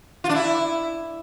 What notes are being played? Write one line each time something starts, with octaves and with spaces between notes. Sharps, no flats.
F4
D4
E4